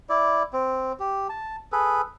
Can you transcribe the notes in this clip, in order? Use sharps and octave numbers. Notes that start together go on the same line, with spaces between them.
E4 D5
C4
G4
A5
G#4 A4 B4